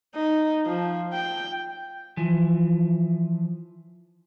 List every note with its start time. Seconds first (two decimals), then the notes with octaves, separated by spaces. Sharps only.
0.16 D#4
0.66 F3
1.13 G5
2.17 E3 F3